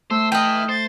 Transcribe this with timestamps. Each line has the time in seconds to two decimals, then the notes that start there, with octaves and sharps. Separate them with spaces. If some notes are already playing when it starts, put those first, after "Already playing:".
0.10 A3 C5 E6
0.32 E4 B4 D#5 G5 F6
0.69 C5 A6